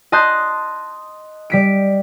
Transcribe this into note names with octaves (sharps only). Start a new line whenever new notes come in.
D#5 A5 C6 F#6 G6
G3 B6 D7